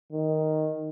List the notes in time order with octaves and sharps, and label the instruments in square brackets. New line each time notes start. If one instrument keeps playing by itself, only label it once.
[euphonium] D#3